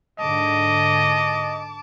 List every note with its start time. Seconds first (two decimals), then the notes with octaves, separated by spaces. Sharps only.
0.19 G#2 D3 D#5 A5 D6